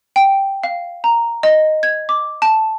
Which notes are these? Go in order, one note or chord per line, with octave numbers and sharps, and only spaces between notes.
G5
F5
A#5
D#5
G#6
D6
A5